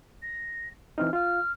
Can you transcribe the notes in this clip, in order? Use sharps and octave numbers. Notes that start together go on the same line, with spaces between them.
A#6
E3 C4 D#4 F6
F4 F5 F6